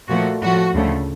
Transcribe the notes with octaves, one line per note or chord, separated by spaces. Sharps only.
A#2 F3 A3 F#4
A2 F3 A3 F#4
D2 C#3 F3 A3